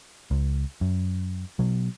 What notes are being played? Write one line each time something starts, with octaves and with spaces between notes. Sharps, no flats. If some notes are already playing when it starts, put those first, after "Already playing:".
C#2
F#2
B2 F#3